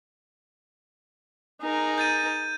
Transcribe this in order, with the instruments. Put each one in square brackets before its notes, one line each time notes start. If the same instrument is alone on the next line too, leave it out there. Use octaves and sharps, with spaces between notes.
[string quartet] D#4 G#4 A#4
[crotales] G6 A6 D#7